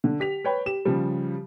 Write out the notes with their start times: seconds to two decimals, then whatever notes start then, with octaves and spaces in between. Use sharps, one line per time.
0.04 D3
0.20 G4 B6 F7
0.44 B4 C#5 G5 B5
0.66 G4 E7
0.85 C#3 F3 G3